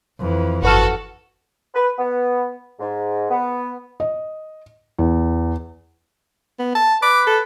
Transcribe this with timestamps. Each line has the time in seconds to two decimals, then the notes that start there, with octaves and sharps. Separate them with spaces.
0.18 F2 E3
0.63 G1 F#4 A4 B4 F6
1.75 B4
1.99 B3
2.79 G#2
3.30 B3
4.00 D#5
4.99 E2
6.59 B3
6.75 A5
7.02 B4 D6
7.27 A4